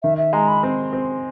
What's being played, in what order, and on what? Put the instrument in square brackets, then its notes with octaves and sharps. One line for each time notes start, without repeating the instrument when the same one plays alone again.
[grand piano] D#3 [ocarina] E5
[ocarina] E5
[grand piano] G#3 [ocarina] A#5
[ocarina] B5
[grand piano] C4
C4